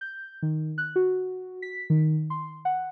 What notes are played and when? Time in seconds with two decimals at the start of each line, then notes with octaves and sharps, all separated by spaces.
0.01 G6
0.42 D#3
0.78 F#6
0.96 F#4
1.62 B6
1.90 D#3
2.30 C6
2.65 F#5